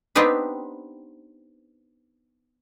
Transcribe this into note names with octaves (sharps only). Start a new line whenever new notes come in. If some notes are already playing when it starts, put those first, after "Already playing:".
B3 C4 D4 D#4 G4 B4